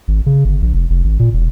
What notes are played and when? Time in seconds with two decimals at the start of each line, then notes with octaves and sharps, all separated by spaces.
0.08 G#1
0.26 C#3
0.45 G1
0.62 A#1
0.73 F1
0.90 F1
1.04 G#1
1.20 A#2
1.33 E1